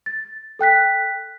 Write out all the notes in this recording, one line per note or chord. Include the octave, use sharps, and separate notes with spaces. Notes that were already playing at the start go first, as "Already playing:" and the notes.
A6
A4 G5 F#6 B6